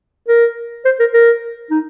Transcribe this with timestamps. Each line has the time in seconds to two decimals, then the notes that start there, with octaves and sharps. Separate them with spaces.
0.28 A#4
0.85 C5
1.00 A#4
1.14 A#4
1.71 D#4